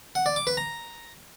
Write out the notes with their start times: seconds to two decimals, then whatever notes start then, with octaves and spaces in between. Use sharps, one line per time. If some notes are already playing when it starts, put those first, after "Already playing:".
0.15 F#5
0.26 D5
0.36 D6
0.47 B4
0.57 A#5